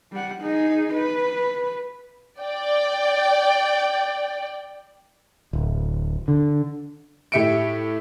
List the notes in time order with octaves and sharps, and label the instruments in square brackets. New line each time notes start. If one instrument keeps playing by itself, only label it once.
[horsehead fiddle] G3 F#5
D#4 G#4
B4
[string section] D5 G5
[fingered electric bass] D1
D3
[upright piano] A2 G4 E5 C#7 D7